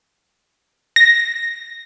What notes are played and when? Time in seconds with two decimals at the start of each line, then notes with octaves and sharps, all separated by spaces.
0.96 A#6